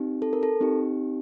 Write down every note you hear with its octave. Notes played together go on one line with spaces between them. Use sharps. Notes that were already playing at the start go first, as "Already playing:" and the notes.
Already playing: C4 D#4 G4
A4
A#4
A4
C4 D#4 G4